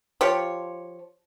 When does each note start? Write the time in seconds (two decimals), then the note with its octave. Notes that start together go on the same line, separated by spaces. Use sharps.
0.21 F3 F4 G4 C#5